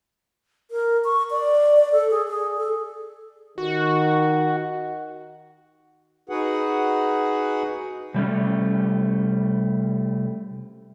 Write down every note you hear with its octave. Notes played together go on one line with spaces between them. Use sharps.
A#4
C#6
D5
D5
A4
G#4
G#4
A4
D#3 F#4
D#4 F#4 G#4 B4 F#5
C3 G3 A3 C#4